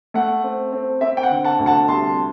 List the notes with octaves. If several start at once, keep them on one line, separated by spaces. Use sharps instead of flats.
A3 F#5
C4
C4
C4 E5
G5
F#5
D3
F#5 A5
D2
F#5 A5
C2 A5 C6